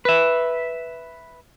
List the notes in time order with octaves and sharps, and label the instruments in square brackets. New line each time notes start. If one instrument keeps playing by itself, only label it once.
[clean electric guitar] B4 E5